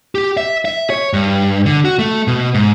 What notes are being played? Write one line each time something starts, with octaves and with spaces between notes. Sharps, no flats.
G4
E5
E5
C#5
G2
D3
F#4
A3
B2
G#2